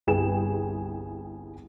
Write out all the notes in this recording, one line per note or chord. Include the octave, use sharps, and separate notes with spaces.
G1 C2 G#4 B4 G5 E7